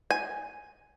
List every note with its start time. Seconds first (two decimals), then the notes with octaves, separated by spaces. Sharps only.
0.11 G#5